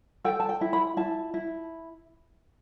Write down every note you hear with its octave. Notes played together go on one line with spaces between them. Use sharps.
A4 G5
A5
G5
E4
B5
E4 A5
E4